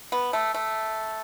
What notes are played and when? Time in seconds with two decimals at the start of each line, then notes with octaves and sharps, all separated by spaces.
0.12 B3
0.33 A3
0.54 A3